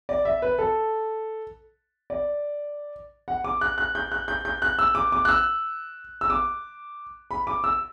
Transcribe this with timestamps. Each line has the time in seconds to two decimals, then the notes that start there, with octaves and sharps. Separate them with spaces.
0.09 D5
0.25 E5
0.42 B4
0.59 A4
2.10 D5
3.28 F#5
3.44 D6
3.61 F#6
3.78 F#6
3.95 G6
4.12 F#6
4.28 G6
4.45 G6
4.62 F#6
4.79 E6
4.95 D6
5.12 D6
5.25 F#6
5.29 E6
6.21 E6
6.30 D6
7.31 B5
7.47 D6
7.64 E6